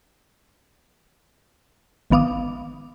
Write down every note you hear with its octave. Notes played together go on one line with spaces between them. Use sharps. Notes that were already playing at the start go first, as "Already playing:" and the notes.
G#1 D#3 B3 F5 D6 D#6